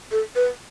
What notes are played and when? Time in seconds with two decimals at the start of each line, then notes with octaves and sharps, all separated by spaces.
0.12 A4
0.36 B4